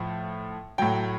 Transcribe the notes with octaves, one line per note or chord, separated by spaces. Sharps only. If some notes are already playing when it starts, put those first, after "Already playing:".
Already playing: A2 F3
A2 F#3 G5